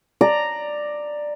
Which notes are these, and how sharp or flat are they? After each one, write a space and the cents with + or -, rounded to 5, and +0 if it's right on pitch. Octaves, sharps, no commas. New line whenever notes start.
D5 +10 A#5 -5